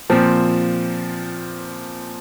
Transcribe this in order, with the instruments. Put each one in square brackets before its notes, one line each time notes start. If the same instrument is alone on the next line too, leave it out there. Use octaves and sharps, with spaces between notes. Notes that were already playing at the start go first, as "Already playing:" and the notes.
[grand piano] A#2 F3 C4